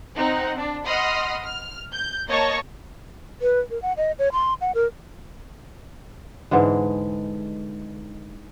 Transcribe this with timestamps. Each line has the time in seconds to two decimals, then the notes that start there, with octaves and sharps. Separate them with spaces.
0.15 C4 D#4 F#5
0.57 D4
0.86 D#5 F#5 B5 C6 D#6 F6
1.42 F6
1.92 G6
2.29 A#3 C#5 D#5 A5 C#6
3.42 B4
3.70 A#4
3.82 F#5
3.97 D#5
4.19 C#5
4.32 C6
4.61 F#5
4.75 A#4
6.51 G#2 D3 E3 G#3